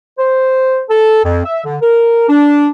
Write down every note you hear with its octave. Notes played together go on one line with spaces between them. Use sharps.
C5
A4
F2
E5
D3
A#4
D4